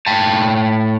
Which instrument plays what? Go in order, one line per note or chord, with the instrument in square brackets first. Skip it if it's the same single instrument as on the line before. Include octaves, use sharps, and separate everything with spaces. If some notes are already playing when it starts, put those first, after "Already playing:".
[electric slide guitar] A2 G5 A5